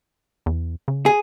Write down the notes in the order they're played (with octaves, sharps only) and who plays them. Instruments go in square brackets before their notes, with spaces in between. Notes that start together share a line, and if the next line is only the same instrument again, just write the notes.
[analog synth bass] E2
C#3
[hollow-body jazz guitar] G#4